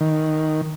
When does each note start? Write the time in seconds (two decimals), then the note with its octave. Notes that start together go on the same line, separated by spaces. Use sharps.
0.01 D#3